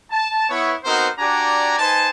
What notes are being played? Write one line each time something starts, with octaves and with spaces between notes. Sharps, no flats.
A5
B3 E4 C#5
B3 C4 D#4 F#4 A#4 C5
D4 F#4 G4 D5 G#5 A#5
D#4 B4 C5 G#5 A5